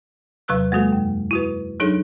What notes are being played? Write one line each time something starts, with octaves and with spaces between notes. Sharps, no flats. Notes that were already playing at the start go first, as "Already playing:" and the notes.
E2 C3 F#3 B4 E6 F#6
G#3 A#3 F#4 A4
F#2
E4 F#4 B4
F#3 D4 D#4 G#4 A4 C#5